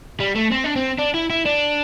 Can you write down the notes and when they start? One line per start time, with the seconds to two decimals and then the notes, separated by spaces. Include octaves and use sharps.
0.20 G3
0.36 A3
0.52 C4
0.65 D4
0.76 C4
0.99 D4
1.14 E4
1.30 E4
1.46 D4